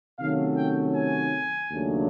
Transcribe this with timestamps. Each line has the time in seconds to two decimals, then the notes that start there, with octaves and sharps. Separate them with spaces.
0.19 C3 D#3 F#3 A3 C#4 F5
0.57 G5
0.95 G#5
1.71 D#2 C#3 F#3 A3 D4